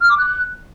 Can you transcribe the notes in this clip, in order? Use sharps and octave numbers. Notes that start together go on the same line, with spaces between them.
F6
D6
F#6